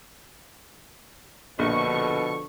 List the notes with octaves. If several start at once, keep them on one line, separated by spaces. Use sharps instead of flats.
A#1 B2 D3 F3 A4 C#6